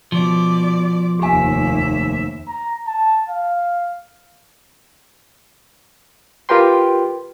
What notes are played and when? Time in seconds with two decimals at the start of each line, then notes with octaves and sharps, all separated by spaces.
0.12 B2 F3 D5
1.19 F1 D#2 A#3 G4 E5 G#5
2.48 A#5
2.87 A5
3.29 F5
6.49 F4 G4 A#4 B4 G5 C6